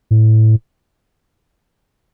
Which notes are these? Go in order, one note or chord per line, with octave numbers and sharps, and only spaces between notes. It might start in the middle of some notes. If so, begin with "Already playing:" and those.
A2